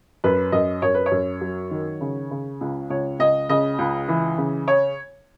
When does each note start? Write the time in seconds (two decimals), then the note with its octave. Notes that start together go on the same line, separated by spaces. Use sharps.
0.24 F#2 B4
0.52 F#2 D#5
0.82 F#2 C#5
0.94 B4
1.06 C#5
1.12 F#2
1.41 F#3
1.71 D#3
2.01 C#3
2.31 C#3
2.61 C#2
2.90 C#2 C#5
3.19 C#2 D#5
3.49 C#3 D#5
3.78 C#2
4.08 E3
4.38 C#3
4.68 C#5